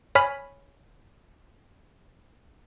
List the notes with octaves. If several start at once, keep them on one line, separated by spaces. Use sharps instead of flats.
C#5 G#5 B5 F6 B6